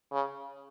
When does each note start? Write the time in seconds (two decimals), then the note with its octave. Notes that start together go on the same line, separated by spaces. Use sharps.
0.12 C#3